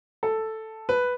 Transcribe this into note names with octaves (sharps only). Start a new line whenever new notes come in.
A4
B4